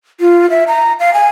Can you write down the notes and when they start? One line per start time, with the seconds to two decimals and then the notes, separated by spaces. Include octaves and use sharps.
0.20 F4
0.50 E5
0.68 A#5
1.00 F5
1.14 G#5